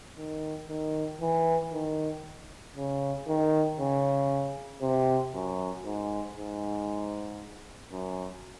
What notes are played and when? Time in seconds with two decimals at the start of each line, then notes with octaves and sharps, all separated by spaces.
0.18 D#3
0.69 D#3
1.21 E3
1.73 D#3
2.76 C#3
3.28 D#3
3.79 C#3
4.81 C3
5.34 F#2
5.85 G#2
6.36 G#2
7.92 F#2